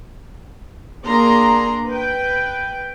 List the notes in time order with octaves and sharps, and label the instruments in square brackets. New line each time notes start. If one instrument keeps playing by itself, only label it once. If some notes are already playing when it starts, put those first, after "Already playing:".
[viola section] A#3 D4 G#4 A#5 C6
B4 G5